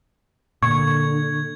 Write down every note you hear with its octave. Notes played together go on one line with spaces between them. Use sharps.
A#2 D3 C#6 G#6